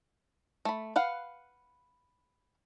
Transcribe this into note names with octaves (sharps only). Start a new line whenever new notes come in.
A3 B5
B4 F5 F#5